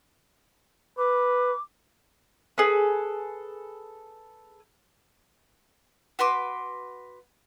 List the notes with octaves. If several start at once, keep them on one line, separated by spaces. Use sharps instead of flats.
B4 D6
G#4 A4 B4
F#4 B4 C6 D6